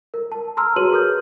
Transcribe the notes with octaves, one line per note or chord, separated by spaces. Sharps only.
A#4
A5
A5 A#5 C6 E6 F6
F#4 G#4 B4 C#5 D#7 F#7
G#4 A#4 D#6 F6 G6